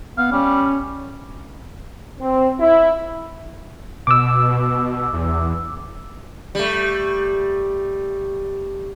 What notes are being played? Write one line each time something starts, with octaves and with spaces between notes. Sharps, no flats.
B3 F5
G3 C#4
C4
E4
B2 D6 E6
E2
G3 A3